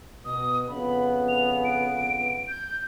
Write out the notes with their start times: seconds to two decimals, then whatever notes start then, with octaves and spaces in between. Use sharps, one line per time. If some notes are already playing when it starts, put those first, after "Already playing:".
0.25 B2 D#6
0.68 F2 C#3 B3 B5
1.29 F7
1.64 D7
2.48 G6